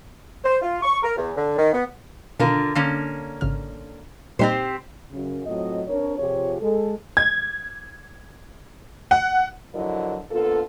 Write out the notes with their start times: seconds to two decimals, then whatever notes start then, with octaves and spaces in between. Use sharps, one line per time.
0.44 C5
0.62 F4
0.83 C#6
1.03 A#4
1.17 E2
1.37 D3
1.58 D#3
1.73 B3
2.39 B2 D3 D#3 F4 A#4
2.75 D3 A#3 C#4
3.41 G#1 C#3 F6
4.39 A#2 G3 C4 D#4 G4 C5
5.12 F#2 C#3
5.47 A2 F#3 C4 F4 D#5
5.88 C4 D4 A#4 C#5
6.18 C3 F3 F4 G4 G#4 C#5
6.61 G#3 A4
7.17 G#6
9.11 F#5
9.74 D3 F3 F#3 E4 A#4 D#5
10.31 D3 A#3 B3 F4 A4